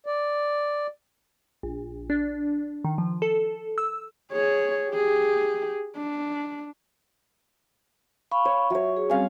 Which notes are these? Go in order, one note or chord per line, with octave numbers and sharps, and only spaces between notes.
D5
A#1
D4
D#3
F3
A4
E6
G#4 C#5
G4 G#4
D4
F5 B5 C#6
C#5
F#3 C#5 E5
G#4
G3 C4 C#4 F5 G#5